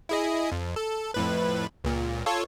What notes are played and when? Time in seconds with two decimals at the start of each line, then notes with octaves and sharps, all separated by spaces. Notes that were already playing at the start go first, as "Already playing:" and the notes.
0.09 E4 G#4 D#5
0.52 F2
0.76 A4
1.14 F2 A2 B4
1.84 C#2 A#2
2.26 F4 A4 C#5